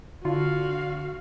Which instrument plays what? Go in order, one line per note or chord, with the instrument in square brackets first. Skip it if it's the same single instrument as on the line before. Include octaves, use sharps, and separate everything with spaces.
[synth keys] D3 [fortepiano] F4 [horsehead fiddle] F#4 F5